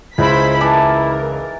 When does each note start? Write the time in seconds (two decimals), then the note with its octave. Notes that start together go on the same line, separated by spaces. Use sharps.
0.18 C#2 G#2 E4 C5 B5 B6
0.61 E3 A#4 D5 A5